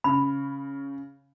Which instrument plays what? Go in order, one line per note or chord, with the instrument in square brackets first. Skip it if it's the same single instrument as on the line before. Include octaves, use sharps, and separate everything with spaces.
[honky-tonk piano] C#3 [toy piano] B5